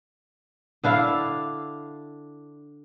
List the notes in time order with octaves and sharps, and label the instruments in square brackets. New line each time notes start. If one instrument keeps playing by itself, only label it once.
[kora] D3 D4 E4 F5